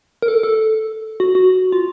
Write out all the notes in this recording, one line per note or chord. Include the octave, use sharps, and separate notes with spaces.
A#4
A4
A4
F#4
F#4
F4